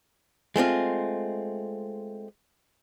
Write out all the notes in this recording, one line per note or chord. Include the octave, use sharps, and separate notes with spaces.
G#3 A3 C4 F4